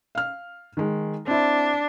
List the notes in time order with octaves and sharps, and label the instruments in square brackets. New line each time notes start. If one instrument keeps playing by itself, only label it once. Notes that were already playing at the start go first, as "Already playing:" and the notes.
[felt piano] F5 F6
D#3 G#3
[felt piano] C4 E4 [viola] D4